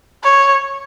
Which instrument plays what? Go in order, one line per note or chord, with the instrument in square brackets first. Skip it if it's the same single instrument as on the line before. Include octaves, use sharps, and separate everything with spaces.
[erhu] C#5